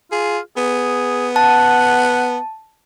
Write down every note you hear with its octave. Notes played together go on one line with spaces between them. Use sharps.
F4 G#4
B3 G#4
F#5 A5